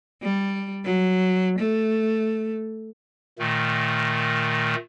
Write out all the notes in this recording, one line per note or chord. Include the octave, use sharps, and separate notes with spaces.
G3
F#3
A3
A#2 D#3 A3